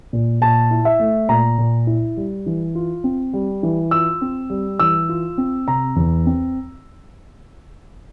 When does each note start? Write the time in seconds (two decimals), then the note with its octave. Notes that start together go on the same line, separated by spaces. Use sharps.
0.13 A#2
0.41 A#2 A5
0.71 E4
0.85 E5
0.99 A3
1.29 A#2 A#5
1.58 A#2
1.87 E4
2.17 G3
2.46 E3
2.75 F4
3.04 C4
3.33 G3
3.63 E3
3.91 F4 E6
4.21 C4
4.50 G3
4.79 E3 E6
5.09 F4
5.38 C4
5.68 C3 A#5
5.96 E2
6.26 C4